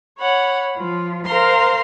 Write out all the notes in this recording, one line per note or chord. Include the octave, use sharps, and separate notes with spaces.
C#5 F#5 B5
F3 F4
A#4 C5 F5 A#5 C6